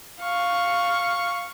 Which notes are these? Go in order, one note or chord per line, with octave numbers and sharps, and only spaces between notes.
F5 C#6